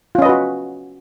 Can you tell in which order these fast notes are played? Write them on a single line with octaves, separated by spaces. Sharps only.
F4 C#4 D#5 B4 F#4